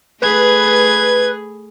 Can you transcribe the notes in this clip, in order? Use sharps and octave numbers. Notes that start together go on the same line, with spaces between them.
A3 G#4 B4 B5 G#6